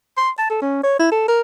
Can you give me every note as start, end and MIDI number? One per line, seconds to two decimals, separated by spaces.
0.17 0.30 84
0.38 0.50 81
0.50 0.60 69
0.62 0.80 61
0.83 0.97 73
0.99 1.08 64
1.11 1.23 69
1.28 1.41 70